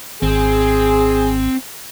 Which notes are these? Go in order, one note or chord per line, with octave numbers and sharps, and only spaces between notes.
G#1 C4 G#4